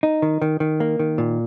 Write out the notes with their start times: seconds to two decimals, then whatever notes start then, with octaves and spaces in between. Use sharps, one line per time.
0.03 D#4
0.22 D#3
0.42 D#3
0.60 D#3
0.80 A#3
0.99 D#3
1.18 A#2